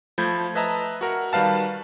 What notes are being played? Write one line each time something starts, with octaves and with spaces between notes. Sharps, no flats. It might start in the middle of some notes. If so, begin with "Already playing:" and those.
F3 A3 B5 G6 G#6
B4 D#5 E5 A5 A#5
F#4 A#4 F#5
D#3 G3 B4 F5 A5